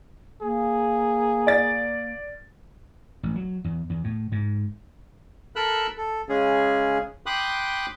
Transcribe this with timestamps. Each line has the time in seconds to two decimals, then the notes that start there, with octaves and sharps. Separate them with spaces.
0.42 A#3 G#4
1.47 D5 A6
3.23 A1
3.36 F#3
3.64 E2
3.90 E2
4.04 A2
4.32 G#2
5.56 A4 A#4 B5 E6 F#6
5.97 A4
6.29 C#3 G#3 C#4 G#4
7.26 G5 B5 C6 D6 D#6 F#6